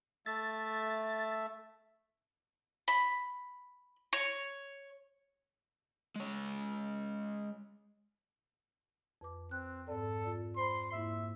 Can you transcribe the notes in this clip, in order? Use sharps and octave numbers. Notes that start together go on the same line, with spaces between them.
A3 E5 A6
B5
C#5
G#3 C#5
F2 B4 D6
C4 F#6
G#2 C4 A4 D5
F4 D5
C5 B5 C6
G#2 A#3 E4 E5